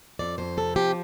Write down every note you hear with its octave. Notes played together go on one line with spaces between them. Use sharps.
F2 D5
F2 C5
C3 A4
F3 G4